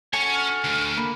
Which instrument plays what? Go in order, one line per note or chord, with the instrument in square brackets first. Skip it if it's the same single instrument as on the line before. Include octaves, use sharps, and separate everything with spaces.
[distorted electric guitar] C#4 C#5 [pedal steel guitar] F#4 A4 G#5
[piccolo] F6
[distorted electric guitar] D2
[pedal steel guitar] A#3 [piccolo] B5